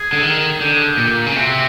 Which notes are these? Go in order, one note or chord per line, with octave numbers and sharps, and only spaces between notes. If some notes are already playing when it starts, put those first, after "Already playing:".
Already playing: G#4
D3
D#3
D3 G4
G#4
G4
A#2
C#3
C3 F#4